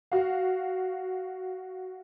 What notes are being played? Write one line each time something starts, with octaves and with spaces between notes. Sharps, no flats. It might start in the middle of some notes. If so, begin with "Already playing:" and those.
F#4 F5